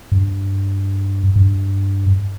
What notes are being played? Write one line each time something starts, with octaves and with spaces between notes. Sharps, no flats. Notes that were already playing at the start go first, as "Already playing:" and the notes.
G2
G2